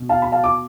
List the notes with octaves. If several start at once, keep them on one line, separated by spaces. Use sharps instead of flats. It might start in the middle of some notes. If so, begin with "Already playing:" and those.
Already playing: B2
F5 A5
B5
F5 A5
D6